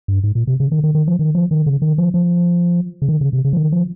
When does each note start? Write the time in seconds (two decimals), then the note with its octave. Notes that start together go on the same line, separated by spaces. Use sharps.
0.08 G2
0.24 G#2
0.35 A#2
0.47 C3
0.60 C#3
0.72 D#3
0.84 D#3
0.95 D#3
1.08 F3
1.19 D#3
1.35 F3
1.51 D#3
1.66 C#3
1.82 D#3
1.98 F3
2.14 F3
3.02 C#3
3.09 D#3
3.21 C#3
3.33 C3
3.45 C#3
3.53 F3
3.57 D#3
3.72 F3